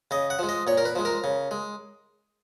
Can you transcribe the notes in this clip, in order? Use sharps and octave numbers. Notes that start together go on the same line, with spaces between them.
C#3 D#5
F#5
F3 G#3
D#5
A#2 C#5
A#4
B4
F3 G#3
A#4
C#3
G#3